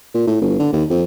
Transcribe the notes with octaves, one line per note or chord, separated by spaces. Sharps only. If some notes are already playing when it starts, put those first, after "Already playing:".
A#2
A2
G1
D3
D#2
F2